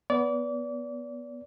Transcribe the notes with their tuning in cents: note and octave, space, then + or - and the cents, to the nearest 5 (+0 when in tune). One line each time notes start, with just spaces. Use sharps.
B3 -10 D5 -30